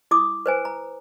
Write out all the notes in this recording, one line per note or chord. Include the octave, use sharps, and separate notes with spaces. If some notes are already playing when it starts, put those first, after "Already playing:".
E4 D6 D#6
B4 C5 G#5
A#5